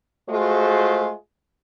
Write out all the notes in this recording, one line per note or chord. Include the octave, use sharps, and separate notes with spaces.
G#3 A3 F4 F#4 G#4 C5